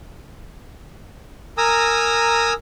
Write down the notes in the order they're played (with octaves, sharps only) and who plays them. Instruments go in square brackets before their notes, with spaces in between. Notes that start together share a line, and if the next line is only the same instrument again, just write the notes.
[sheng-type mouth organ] A#4 G#5 A#5 D#6 E6